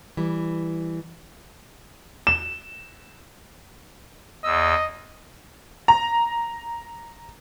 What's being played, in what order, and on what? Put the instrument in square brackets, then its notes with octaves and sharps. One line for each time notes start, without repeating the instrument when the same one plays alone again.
[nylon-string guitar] E3 G3
[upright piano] E7
[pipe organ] E2 E6 [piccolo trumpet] D#5
[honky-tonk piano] A#5